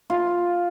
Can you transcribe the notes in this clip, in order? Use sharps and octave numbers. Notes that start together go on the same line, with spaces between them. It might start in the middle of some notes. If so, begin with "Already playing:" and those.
F4